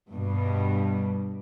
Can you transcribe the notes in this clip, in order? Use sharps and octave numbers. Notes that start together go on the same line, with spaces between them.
G2 B2